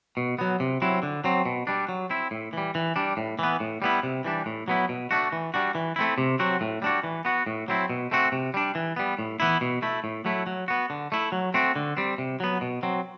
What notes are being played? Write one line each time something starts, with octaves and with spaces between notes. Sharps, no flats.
B2
F#3 B3
C3
F#3 C4 E4
D3
F#3 C4
B2
G3 D4
F#3
C4 E4
A2
E3 G3
E3
G3 D4
A2
E3 B3
A2
G3 B3 E4
C3
E3 G3 D4
A2
F#3 B3 E4
B2
A3 D4 F#4
E3
G3 D4 F#4
E3
A3 C4 E4
C3
F#3 C4 F#4
A2
G3 D4 F#4
E3
B3 F#4
A2
F#3 C4 E4
B2
A3 C4 F#4
C3
G3 D4
E3
G3 B3
A2
E3 B3 E4
B2
A3 E4
A2
F#3 A3 E4
F#3
B3 F#4
D3
A3 E4
F#3
A3 C4 F#4
D3
G3 C4
C3
F#3 B3
B2
F#3 C4